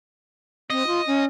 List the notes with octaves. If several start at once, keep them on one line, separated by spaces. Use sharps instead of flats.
C4 D#5
F4
C#4